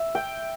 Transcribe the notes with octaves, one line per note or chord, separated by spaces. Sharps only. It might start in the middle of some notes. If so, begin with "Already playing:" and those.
Already playing: E5
G5